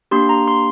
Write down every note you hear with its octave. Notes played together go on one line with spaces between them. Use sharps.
A#3 D4 G4 C6
A#5
C6